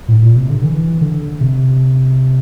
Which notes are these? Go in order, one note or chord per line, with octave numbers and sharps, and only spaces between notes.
A2
A#2
C3
D3
E3
D3
C3